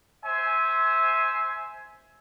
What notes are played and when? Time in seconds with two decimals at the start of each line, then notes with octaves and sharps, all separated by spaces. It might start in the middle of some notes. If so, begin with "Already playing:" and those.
0.24 C5 E5 G#5